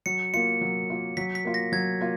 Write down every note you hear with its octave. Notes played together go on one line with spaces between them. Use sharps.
F#3 C#7
A#3 F4 C#7
F#3
A#3 F4
F#3 B6
B6
A#3 F4
A#6
F#3 G#6
A#3 F4